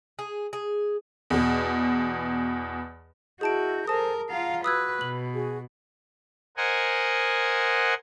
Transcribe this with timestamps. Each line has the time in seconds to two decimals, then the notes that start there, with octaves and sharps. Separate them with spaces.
0.19 G#4
0.53 G#4
1.30 E2 B2
3.41 E4 F#4 G#4 D#5 A5 G6 D7
3.87 A4 A#4 C5 G#5 A5 D#6
4.29 F4 F5 F#5 A#5
4.64 F#4 B4 D#6 E6 F#6 G#6
5.01 B2 F#7
5.34 F#4 G#4
6.57 A#4 C5 D#5 F#5 G#5